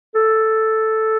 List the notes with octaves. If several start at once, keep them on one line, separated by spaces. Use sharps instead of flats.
A4